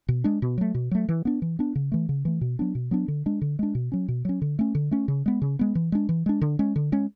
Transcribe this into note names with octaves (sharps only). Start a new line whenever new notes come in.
B2
G#3 D4
B2
F#3 A3
B2
F#3 A3
E3
B3 D4
E3
B3 D4
C#3
E3 A3
C#3
E3 A3
B2
F#3 B3 D4
B2
F#3 B3 D4
D3
G#3 D4
D3
G#3 D4
B2
F#3 C#4
B2
F#3 C#4
D3
A3 C#4
D3
A3 C#4
C#3
G#3 B3
C#3
G#3 B3
E3
G#3 D4
E3
G#3 D4
D3
G#3 C#4
D3
G#3 C#4